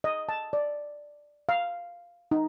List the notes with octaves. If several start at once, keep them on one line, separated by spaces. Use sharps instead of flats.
D#5
A5
D5
F5
D#4